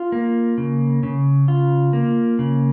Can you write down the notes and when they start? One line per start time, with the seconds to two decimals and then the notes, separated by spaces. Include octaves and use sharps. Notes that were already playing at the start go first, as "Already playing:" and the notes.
Already playing: F4
0.12 A#3
0.58 C#3
1.03 C#3
1.48 F4
1.93 A#3
2.39 C#3